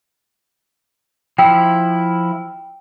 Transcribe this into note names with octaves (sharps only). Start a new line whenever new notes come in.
F3 E4 G5